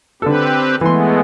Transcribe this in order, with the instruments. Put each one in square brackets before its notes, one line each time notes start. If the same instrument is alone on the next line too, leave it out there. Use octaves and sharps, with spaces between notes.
[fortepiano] D3 A4 [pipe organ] C4 G4 B4
[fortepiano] E3 C6 [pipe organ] G#3 A3 B3